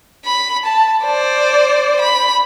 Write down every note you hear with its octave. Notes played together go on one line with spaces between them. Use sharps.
B5
A5
C5 D5
B5